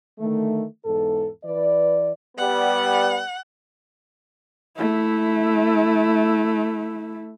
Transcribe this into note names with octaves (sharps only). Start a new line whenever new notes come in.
D3 D#3 A3
E2 G#2 A4
E3 B4 D5
G3 B3 F#5
A3 E4